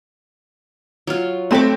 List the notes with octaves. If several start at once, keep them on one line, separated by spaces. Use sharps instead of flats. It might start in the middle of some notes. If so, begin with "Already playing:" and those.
F#3 F4
A3 C4 F#5 B5 D6